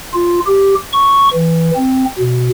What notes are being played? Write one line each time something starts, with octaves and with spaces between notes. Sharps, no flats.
F4
G4
C#6
E3
C4
B2